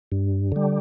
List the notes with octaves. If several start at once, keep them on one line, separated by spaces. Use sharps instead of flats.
G2
D3 G3